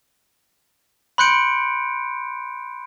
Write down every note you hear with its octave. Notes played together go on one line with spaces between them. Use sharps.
B5 C6 F#6 G6 C#7 D7